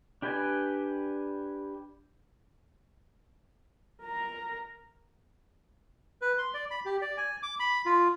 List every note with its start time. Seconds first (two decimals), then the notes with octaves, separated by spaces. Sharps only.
0.22 D4 G4 B4 G5 G#5
4.03 A#4 A#5
6.22 B4
6.38 C6
6.54 D5
6.71 B5
6.86 G4
7.02 D5
7.18 G#5
7.43 D6
7.59 B5
7.86 F4